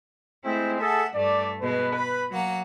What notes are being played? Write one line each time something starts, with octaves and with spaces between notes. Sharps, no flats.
G#3 A3 C4 E4
G#4 A4 E5 F#5
G2 A3 D5
B2 G#3 B4
B5
F#3 A#3 F#5